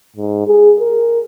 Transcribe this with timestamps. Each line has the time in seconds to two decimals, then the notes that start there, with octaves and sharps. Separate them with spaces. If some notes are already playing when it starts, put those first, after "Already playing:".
0.17 G#2
0.47 G#4
0.80 A#4